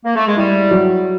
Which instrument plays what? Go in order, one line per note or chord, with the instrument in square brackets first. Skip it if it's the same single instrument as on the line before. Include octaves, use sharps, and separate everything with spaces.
[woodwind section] A#3
A3
G#3
[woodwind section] G3 [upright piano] E4
[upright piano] F#3